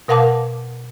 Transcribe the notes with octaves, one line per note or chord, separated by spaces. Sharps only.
B2 A#4 F5 F#5 A5 D6